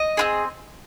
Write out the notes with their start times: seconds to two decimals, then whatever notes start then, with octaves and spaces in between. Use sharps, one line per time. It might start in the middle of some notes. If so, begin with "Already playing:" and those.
Already playing: D#5
0.17 C4 F4 G#4